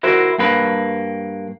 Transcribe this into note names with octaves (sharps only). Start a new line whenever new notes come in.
E4 F#4 A#4 C5
G2 A#3 B4